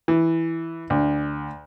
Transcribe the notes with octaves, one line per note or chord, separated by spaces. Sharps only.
E3
D2